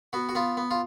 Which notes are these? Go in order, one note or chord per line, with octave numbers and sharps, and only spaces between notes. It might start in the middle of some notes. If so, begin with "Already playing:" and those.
B3 F#4
F#4
B3 F4
B3
F4